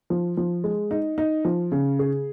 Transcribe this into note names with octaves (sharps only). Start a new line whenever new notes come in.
F3
F3
G#3
D#4
D#4
F3
C#3
G#4